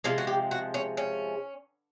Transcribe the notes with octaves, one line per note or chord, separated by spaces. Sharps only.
C3 F3 G#3 F4
F#4
G4
F#4
C#4
C#4